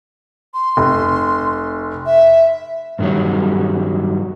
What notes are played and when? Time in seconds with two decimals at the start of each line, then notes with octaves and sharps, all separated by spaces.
0.54 C6
0.77 F1
2.06 E5
2.99 G2 D3 D#3 F#3 G3